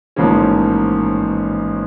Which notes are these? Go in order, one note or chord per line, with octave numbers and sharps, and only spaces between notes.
A1 G#2 F3 A#3 C#4